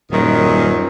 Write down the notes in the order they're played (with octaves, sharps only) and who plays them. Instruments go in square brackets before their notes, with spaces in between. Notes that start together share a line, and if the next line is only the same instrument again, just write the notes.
[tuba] D#1 [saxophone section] F#2 D#3